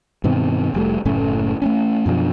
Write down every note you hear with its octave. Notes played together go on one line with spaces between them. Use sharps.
G2 B2 D#3 C4
F1 G3 A3
F#1 A2 A3 C#4
A3 B3 C#4
F#2 B2 F3 D4